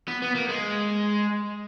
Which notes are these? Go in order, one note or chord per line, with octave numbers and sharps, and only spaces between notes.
B3
B3
A#3
G#3